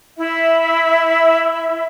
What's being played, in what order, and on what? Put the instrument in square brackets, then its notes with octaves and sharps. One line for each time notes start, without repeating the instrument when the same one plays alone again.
[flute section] E4 E5